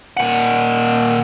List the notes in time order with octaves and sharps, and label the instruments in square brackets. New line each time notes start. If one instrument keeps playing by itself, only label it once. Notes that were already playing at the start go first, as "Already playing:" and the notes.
[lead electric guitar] A#2 F#5